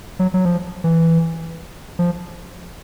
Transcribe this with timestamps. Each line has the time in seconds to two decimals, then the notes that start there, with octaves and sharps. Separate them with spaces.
0.19 F#3
0.34 F#3
0.45 F3
0.84 E3
1.99 F3